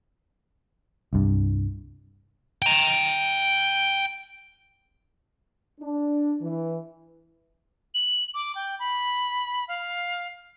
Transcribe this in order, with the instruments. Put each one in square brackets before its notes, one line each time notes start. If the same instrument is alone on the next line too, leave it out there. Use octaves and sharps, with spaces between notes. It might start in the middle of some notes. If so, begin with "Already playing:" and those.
[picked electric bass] C2 G2
[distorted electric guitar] G5 A#5
[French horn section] D4
E3
[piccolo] F#7
D6
G5
B5
F5